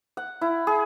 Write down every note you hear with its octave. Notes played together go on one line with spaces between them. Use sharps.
F#5
E4
G#4